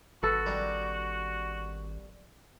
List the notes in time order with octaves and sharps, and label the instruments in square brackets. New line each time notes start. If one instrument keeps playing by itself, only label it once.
[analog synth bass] G#1 [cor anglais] F#4 [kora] A4 B4
[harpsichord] G3 D4 A#4